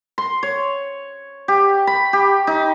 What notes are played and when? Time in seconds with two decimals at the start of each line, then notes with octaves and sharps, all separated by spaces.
0.18 C6
0.43 C#5
1.48 G4
1.87 B5
2.13 G4
2.47 D#4